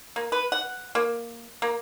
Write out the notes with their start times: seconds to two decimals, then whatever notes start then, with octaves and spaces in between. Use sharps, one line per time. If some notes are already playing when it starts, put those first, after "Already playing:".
0.16 A#3
0.32 B4
0.52 F#5
0.95 A#3
1.62 A#3